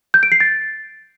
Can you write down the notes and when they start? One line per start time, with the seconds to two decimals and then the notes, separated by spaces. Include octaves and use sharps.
0.14 G6
0.23 D7
0.32 C7
0.40 A6